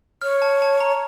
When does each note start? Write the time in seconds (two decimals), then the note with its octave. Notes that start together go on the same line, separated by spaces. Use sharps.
0.22 C#5 F6
0.42 A5
0.62 A5
0.80 A#5